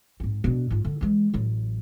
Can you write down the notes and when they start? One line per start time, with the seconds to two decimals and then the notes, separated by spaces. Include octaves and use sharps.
0.20 G#2 C4
0.44 B2 D4
0.70 G#2 F4
0.85 D3
1.01 E3 G#3
1.34 A1 F#3